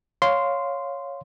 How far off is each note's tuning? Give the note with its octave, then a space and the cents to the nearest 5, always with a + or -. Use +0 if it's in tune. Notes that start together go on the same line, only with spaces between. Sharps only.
C#5 +0 F5 +5 C6 -10